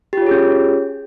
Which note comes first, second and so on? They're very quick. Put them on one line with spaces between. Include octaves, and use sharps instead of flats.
G4 F4 C#5 G#4 C#4